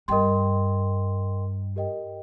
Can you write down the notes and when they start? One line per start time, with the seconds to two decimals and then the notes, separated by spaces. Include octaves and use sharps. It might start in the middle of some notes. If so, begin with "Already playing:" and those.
0.08 G2 A#4 D#5 G5 C6
1.76 G4 A#4 D#5 G5